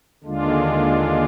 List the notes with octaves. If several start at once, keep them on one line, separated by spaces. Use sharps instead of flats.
D#2 D3 G#3 D4 F4